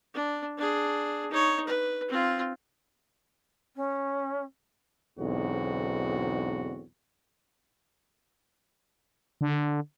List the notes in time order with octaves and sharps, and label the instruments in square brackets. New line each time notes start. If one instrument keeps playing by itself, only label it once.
[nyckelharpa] D4
D4 G#4
D#4 C#5
B4
C4 F4
[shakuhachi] C#4
[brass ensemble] B1 E2 G#2 D3 C4 F#4
[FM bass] D3